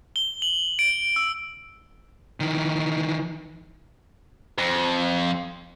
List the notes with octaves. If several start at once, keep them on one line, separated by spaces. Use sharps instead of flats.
G7
F#7
D7
E6
D#3 E3
F2